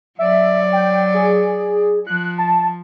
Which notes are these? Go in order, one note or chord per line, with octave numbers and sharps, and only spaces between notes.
F#3 D5 E5
G5
G#4
F3 F#6
A5